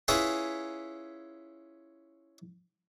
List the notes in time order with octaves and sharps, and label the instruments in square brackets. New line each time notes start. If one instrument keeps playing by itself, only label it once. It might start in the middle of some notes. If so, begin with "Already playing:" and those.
[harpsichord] C#4 E4 F4 G#4 B4